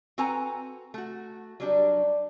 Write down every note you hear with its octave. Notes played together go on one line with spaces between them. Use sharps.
C4 F#4 A4 B4 G#5 A#5
A3 F#4
F#3 G3 D4